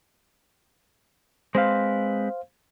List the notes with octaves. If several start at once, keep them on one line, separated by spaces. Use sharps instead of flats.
G#3 C4 B4 C5 F5